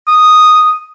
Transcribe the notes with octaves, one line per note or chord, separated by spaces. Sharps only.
D#6